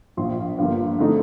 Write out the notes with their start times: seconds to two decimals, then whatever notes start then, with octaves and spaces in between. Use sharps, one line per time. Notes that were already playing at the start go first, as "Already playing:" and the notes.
0.17 A#1 A#2 F3 C6
0.58 G2 D3 F3 A#3
0.99 D3 A3 C4 D#4